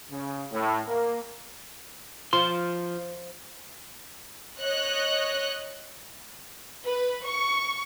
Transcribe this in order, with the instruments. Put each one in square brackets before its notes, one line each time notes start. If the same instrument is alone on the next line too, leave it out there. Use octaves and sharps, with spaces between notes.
[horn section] C#3
A2
A#3
[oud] F3 [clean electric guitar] C6
[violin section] C#5 D#5 F#6
B4
C#6